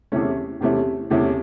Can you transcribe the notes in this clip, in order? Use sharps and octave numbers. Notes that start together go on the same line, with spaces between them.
E2 C3 E3 A3 C#4
E2 C3 E3 A3 C#4
E2 C3 E3 A3 C#4